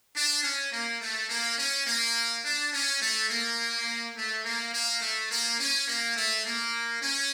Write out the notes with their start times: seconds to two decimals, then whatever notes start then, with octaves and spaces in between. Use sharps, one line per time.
0.15 D4
0.43 C#4
0.72 A#3
1.01 A3
1.29 A#3
1.58 C#4
1.87 A#3
2.45 D4
2.73 C#4
3.01 A3
3.30 A#3
4.17 A3
4.45 A#3
4.74 A#3
5.02 A3
5.31 A#3
5.60 C#4
5.88 A#3
6.16 A3
6.46 A#3
7.02 C#4